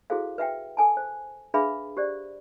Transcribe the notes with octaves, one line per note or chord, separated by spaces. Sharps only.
E4 F#4 G#4 A4 C5 F5
B4 E5 F#5 G5
A4 G#5 A5
C5
D4 G#4 B4 E5 F5 B5
G4 C5 D5